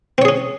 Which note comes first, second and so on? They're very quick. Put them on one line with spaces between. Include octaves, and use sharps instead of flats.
C4 C#5 G#4 C#4